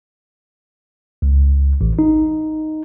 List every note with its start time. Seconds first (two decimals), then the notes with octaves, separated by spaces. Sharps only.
1.22 C#2
1.81 A1
1.99 D#4